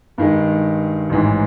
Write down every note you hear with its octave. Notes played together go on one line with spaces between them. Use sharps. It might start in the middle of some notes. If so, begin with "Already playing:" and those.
G2 D#3 G#3
A1 G#2 E3